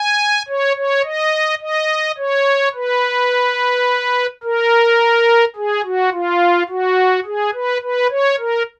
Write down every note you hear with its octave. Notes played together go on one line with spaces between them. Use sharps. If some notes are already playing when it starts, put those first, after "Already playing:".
Already playing: G#5
C#5
C#5
D#5
D#5
C#5
B4
A#4
G#4
F#4
F4
F#4
G#4
B4
B4
C#5
A#4